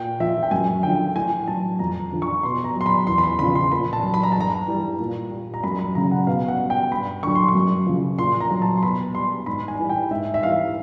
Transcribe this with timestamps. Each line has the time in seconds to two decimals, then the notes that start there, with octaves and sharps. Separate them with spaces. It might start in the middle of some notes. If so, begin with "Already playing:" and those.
Already playing: A#2 G5
0.20 F3 E5
0.43 G5
0.51 F#2 G#5
0.83 D3 F3 G5
1.15 A2 G#5
1.48 F#3 A5
1.79 F2 A#5
2.12 D3 F3
2.22 C#6
2.43 B2 C6
2.64 A#5
2.76 F#3 C6
2.86 B5
3.07 E2 C6
3.18 B5
3.24 C6
3.39 C#3 F3 B5
3.55 C6
3.71 A#2 B5
3.93 A5
4.03 F#3
4.14 B5
4.23 A#5
4.32 G2 A5
4.41 A#5
4.67 E3 G3
5.00 A#2
5.31 G3
5.54 A#5
5.64 F#2 B5
5.79 B5
5.95 C#3 F#3 A#5
6.11 F#5
6.27 B2 F5
6.48 F#5
6.59 G3
6.70 G5
6.91 G2 B5
7.23 D3 F#3 C#6
7.35 C6
7.48 C#6
7.54 F#2
7.86 C#3 F3
8.18 A#2 C6
8.40 A#5
8.51 F#3
8.62 A5
8.77 C6
8.83 B2 B5
9.15 G3 C6
9.46 G#2 B5
9.68 G#5
9.79 E3 G3
9.89 G5
10.11 G#2 E5
10.34 E5
10.43 E3 G3 F5